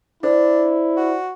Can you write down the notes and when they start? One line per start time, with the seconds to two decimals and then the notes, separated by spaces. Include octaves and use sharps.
0.23 D4 E4 C5 D5
0.97 F#4